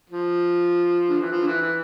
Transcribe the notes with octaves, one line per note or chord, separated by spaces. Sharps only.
F3
D3
E3
F3
D3
E3
E3